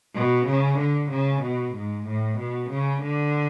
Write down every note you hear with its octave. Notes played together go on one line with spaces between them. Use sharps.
B2
C#3
D3
C#3
B2
G#2
A2
B2
C#3
D3